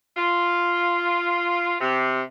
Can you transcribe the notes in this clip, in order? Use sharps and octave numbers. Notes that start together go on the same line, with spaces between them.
F4
C3